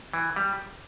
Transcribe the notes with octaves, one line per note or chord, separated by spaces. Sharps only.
E3
G3